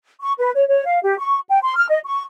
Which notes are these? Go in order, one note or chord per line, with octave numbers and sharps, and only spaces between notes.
C#6
B4
C#5
C#5
F5
G4
C#6
G5
C6
F6
D#5
C#6